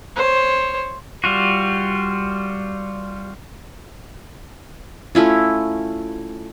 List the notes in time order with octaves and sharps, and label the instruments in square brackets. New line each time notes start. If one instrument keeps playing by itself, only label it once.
[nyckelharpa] C5 C#5
[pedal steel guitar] G3 F4 F#4
[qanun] A3 C#4 E4 F4